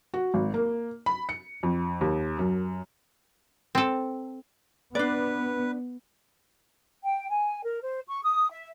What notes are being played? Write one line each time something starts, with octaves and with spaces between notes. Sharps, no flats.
F#4
G#1
A#3
B5
C#7
F2
D#2
F#2
C4 A4
B3 D4 B4 D5
G5
G#5
A#4
C5
C#6
D#6
E5